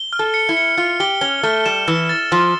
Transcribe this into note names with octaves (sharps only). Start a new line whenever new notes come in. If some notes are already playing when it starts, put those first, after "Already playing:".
Already playing: G7
F6
A4
C#7
E4
C#7
F4 F6
G4 G7
C#4 G7
A3 F6
G3 E7
E3 E6
A6
F3 E6